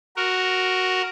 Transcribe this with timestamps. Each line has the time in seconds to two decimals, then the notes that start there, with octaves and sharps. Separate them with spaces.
0.16 F#4 A#4